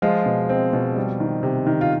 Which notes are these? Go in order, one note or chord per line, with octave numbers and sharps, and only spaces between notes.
F3 G#3 F4
B2
C4
B2
G3
D#3
C3
D#3
F4